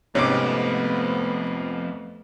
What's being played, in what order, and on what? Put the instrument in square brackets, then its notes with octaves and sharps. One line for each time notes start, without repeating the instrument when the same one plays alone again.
[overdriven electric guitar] F2 [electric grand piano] G#2 C3 [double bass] A3 B3 [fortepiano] C#4 D6